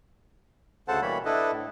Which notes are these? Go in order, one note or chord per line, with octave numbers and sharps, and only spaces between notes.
D2 C#3 A4 C5 F#5 A5
B2 E3 G3 A#3 C#5 B5
D4 E4 A4 B4 D#5
A2